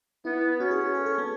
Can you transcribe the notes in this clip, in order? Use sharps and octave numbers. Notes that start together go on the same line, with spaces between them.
B3 E4
C#4 F#4
G#4
G#4
A4
A4
B3